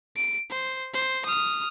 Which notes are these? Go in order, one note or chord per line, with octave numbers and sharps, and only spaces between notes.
D7
C5
C5
D#6 F6